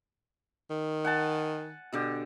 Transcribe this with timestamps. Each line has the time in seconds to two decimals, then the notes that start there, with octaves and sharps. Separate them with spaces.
0.70 D#3
1.05 F#5 G#5 A5
1.92 B2 D3 G4